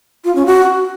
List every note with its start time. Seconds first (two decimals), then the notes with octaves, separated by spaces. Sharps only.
0.24 F4
0.35 C#4
0.46 F#4